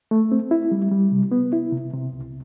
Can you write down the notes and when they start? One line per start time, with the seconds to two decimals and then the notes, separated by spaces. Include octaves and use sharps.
0.11 A3
0.32 C4
0.51 E4
0.72 G3
0.91 G3
1.12 C3
1.32 B3
1.53 E4
1.72 C3
1.93 C3
2.13 C2